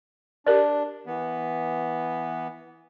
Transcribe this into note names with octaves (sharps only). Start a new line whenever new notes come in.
D4 G4 A#4 D5
E3 B3